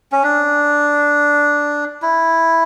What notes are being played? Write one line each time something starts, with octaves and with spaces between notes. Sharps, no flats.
C#4
D4
E4